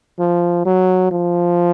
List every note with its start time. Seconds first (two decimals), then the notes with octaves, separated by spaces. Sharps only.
0.19 F3
0.66 F#3
1.11 F3